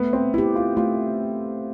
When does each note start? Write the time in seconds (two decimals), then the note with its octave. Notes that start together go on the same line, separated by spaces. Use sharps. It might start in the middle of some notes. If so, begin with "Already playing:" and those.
Already playing: A3 B3
0.13 C4
0.34 C4 E4 G4
0.55 F4
0.77 A3 F4